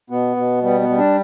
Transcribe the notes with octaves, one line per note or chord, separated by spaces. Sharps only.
B2 B3
B2
G3 B3
B3
G3
D4